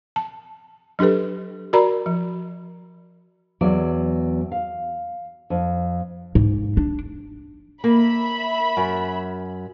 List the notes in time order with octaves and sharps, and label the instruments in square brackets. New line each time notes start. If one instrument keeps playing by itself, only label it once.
[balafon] A5
F#3 D4 G4 A4 B4
F#4 A#4 D5 A#5 B5
F3
[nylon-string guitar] E2 F#3 D5
F5
F2
[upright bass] G#2
D4
[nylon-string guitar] A#3 [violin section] E5 B5
[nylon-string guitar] F#2